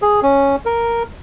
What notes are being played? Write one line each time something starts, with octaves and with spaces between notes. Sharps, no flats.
G#4
C#4
A#4